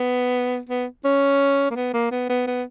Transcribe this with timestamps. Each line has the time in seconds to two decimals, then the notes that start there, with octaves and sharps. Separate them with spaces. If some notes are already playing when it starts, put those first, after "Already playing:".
Already playing: B3
0.69 B3
1.05 C#4
1.71 A#3
1.76 B3
1.94 A#3
2.12 B3
2.29 B3
2.47 B3